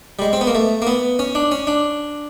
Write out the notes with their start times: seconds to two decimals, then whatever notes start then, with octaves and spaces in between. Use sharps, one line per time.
0.19 G3
0.22 G#3
0.33 C4
0.41 B3
0.47 A#3
0.55 A3
0.82 A#3
0.87 B3
1.19 C#4
1.35 D4
1.52 C#4
1.67 D4